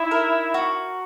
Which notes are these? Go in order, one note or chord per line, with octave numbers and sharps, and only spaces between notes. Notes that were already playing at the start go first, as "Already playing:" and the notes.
Already playing: D#4 E4
A#4
F#4